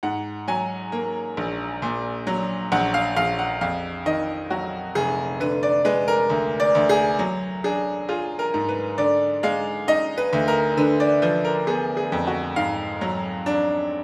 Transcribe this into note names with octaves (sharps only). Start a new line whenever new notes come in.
G#2 F#5
F#3 G#5
A#3
A#1
A#2
F#3
A#1 F#5
F5
A#1 F5
F#5
F2 F5
D#3 D#5
F#3 F#4
F1 G#4
D3 B4
D5
G#3 B4
A#4
D2
D5
D2
G#4
F#3
D4 G#4
F4 G#4
A#4
G#2
B4
D3 D5
G#3 F5
D#4 D#5
B4
D2
A#4
D3 B4
D5
F3 B4
A#4
B3 G#4
G#4
F2
F#4
G#2 F5
F#3
D4